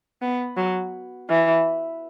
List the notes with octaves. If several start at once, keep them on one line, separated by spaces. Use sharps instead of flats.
B3
F#3
E3